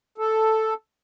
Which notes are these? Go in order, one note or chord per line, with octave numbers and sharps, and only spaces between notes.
A4